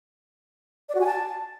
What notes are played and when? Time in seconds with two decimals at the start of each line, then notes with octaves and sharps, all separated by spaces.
0.89 D5
0.95 F#4
1.01 G#5
1.06 A5